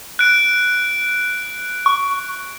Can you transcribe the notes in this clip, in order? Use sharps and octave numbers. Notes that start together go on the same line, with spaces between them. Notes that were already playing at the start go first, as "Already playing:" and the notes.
F#6 D7
C#6